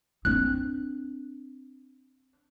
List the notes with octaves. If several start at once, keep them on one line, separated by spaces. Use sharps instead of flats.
C4 D4 F#6